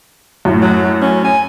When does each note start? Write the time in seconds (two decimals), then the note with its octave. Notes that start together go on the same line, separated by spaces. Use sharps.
0.45 F#2 A2
0.62 F#3
1.02 C#4
1.24 G#5